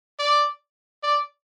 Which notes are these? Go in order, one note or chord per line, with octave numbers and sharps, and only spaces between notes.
D5
D5